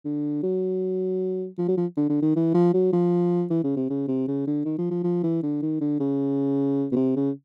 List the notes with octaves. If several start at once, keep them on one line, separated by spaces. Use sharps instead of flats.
D3
F#3
F3
F#3
F3
D3
D3
D#3
E3
F3
F#3
F3
E3
C#3
C3
C#3
C3
C#3
D3
D#3
F3
F3
F3
E3
D3
D#3
D3
C#3
B2
C3
C#3